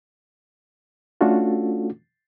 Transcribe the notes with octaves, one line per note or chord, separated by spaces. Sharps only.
A3 C#4 D4 F4 F#4 A4